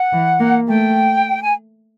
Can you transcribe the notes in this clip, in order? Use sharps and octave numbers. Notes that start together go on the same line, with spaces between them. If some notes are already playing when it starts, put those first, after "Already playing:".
Already playing: F#5
E3
A#3
A3 G5
G#5